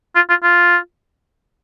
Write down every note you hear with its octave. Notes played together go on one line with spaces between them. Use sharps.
F4
F4
F4